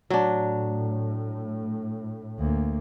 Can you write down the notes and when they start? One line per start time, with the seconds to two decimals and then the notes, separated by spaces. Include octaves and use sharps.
0.10 A2 F#3 D4
2.38 D2 A#3